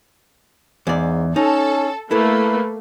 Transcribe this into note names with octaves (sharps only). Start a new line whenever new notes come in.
E2 G#2 D5
C#4 D#4 A4
A3 A#3 E4 A4 B4